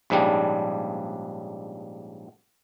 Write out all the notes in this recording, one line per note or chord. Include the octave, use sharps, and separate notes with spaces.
A#1 G#2 C#3 G3 D4